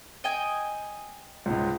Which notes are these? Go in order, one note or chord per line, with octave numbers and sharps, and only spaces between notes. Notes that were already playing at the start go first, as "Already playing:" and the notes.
D#5 G5 G#5
C#2 G#2